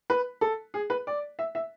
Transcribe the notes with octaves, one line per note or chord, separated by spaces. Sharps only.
B4
A4
G#4
B4
D5
E5
E5